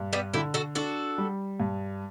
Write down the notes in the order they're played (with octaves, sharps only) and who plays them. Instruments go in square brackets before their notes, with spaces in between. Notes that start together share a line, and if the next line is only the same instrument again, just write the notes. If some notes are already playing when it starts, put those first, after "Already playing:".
Already playing: [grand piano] G2
[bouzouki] G3 B3
[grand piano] D3 [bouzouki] E4 G4
[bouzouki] F#4 A4
[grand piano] D4 [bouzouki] F#4 A4
[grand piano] G3
G2